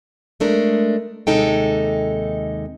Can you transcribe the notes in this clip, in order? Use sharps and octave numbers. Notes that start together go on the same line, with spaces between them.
G#3 A3 D4 A#4
D#2 C3 G#3 D#4 A4 G5